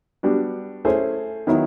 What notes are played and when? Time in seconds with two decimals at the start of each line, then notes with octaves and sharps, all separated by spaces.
0.23 G3 B3 D4 F#4
0.85 A3 C#4 E4 G#4 C5
1.47 D#3 F#3 B3 E4